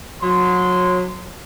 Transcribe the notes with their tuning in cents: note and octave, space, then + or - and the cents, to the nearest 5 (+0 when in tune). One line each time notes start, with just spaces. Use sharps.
F#3 -30 C6 -15